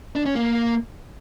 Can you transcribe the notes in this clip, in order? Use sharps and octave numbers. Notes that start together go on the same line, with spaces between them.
D4
C#4
A#3